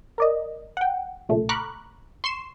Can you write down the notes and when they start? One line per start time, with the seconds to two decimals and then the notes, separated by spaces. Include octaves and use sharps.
0.18 A#4 D5 D#5
0.77 F#5 G5
1.29 B1 A#2 C#3 A3
1.49 A#5 B5 C#6 D6 F6 F#6
2.24 C6 C#6 C7 E7